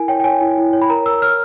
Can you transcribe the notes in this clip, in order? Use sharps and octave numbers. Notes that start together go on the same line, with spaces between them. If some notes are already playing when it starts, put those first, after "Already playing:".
Already playing: E4 A#4 G#5
C#5 G5
G5
C#5 G#5
E4
E4
C#5
B5
A#4 A#5
A#4 E6
C#5 F6